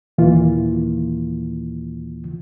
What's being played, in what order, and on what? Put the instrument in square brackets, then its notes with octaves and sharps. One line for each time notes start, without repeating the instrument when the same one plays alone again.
[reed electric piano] D#2 A#2 E3 A#3 F4